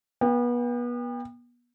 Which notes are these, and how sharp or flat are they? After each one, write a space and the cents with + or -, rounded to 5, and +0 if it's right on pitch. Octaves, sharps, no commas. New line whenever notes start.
B3 -30 G5 +30